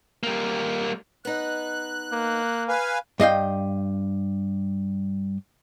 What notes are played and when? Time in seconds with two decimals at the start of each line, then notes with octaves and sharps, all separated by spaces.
0.23 G3 A#3
1.25 B3 D#4 F#6
2.12 A#3
2.68 B4 F5 G#5
3.20 G2 D#5 F5 G5